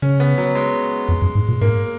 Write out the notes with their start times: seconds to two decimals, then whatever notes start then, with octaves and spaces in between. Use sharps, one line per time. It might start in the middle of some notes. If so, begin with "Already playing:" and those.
0.02 C#3 C#4
0.20 B3
0.38 F#3
0.55 G#3
1.08 F2
1.22 F#2
1.35 G#2
1.48 A#2
1.61 G#2 A#3